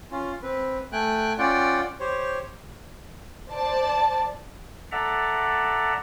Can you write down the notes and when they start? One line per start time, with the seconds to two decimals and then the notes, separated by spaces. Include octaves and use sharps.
0.11 C#4 F4
0.43 C4 B4
0.92 A3 G5 G#5 F#6
1.38 C#4 F4 D5 F#5 G5
2.00 G4 C5 C#5
3.49 C5 D5 A5
4.92 A4 D5 E5 F#5 A#5